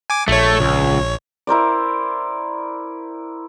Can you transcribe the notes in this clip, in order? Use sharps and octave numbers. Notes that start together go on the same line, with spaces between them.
G#5 D6
A#1 A3 C#5
C#2
E4 A#4 C5 D5